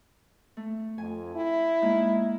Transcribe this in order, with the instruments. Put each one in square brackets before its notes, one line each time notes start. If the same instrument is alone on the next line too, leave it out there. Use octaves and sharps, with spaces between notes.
[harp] A3
[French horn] F2 [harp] G#5
[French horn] E4
[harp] G#3 A#3 D#4